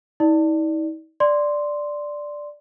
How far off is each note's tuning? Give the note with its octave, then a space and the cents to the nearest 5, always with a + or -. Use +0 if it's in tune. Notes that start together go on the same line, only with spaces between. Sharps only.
D#4 +45 D5 +0
D5 +0 C6 -5